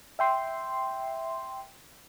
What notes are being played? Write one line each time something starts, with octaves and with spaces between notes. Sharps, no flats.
E5 G5 C6